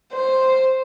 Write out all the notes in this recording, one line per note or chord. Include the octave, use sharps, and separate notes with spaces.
C5